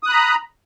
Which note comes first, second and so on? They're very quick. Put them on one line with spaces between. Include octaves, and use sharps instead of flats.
D#6 F#6 B5 A#5